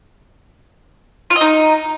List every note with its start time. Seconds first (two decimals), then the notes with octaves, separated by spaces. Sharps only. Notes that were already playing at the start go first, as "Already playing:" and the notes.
1.30 F4
1.36 D#5
1.41 D#4